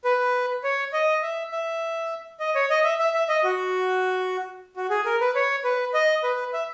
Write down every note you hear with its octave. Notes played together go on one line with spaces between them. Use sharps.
B4
C#5
D#5
E5
E5
D#5
C#5
D#5
E5
E5
E5
D#5
F#4
F#4
G#4
A#4
B4
C#5
B4
D#5
B4
E5